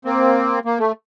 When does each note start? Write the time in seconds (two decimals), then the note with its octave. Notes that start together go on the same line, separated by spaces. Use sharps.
0.05 A#3 C4
0.65 A#3
0.79 A3